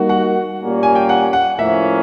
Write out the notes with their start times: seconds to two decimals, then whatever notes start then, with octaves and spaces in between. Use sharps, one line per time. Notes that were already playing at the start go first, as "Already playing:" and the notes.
Already playing: G3 A#3 D#4 F#4
0.09 F#5
0.59 A#2 G3 A#3 C#4
0.83 G#5
0.95 G5
1.09 F#5
1.33 F#5
1.58 A2 F3 A#3 C#4 E5